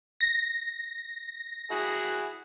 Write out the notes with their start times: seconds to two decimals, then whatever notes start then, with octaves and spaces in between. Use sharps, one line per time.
0.21 A#6
1.71 E4 F#4 G#4